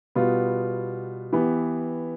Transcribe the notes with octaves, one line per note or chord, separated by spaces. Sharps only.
B2 G3 B3 F4
E3 B3 E4 G4